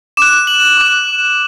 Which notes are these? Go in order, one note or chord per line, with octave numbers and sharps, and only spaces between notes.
D6 F#6 E7
F#7
D6 F#6